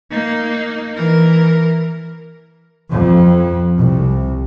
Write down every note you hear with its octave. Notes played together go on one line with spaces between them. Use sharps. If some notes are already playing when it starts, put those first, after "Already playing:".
A#3 D#4
E3 A#4
F2
C2